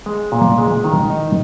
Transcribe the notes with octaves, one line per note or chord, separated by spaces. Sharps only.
G#3
A#2
G#3
D#3
D#4